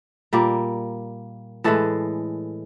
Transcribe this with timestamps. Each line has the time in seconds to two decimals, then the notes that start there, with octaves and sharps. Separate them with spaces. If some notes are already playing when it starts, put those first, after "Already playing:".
0.33 A#2 G3 A#3
1.64 A2 E3 G#3 A4